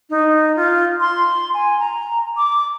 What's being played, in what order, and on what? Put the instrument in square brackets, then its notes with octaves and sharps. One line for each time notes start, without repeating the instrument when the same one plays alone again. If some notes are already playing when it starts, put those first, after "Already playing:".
[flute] D#4
F4
C6
G#5
A#5
D6